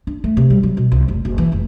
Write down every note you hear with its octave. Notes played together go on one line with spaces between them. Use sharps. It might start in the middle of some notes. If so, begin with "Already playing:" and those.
D4
A3
C3
G3
F#3
B2
C2
F1
F#1
E3
F1